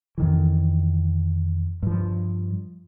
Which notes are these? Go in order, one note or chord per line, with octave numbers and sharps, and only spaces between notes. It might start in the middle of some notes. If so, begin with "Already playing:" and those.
F2 D#3 E3
G2 F3